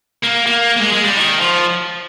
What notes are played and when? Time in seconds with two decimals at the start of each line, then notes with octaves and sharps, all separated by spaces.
0.24 A#3
0.46 A#3
0.77 A#3
0.81 G#3
0.93 G#3
1.04 G3
1.16 D#3
1.39 F3